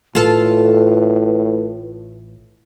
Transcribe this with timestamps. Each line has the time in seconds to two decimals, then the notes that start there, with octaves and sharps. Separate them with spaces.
0.15 A1 A2 F4 A4 B4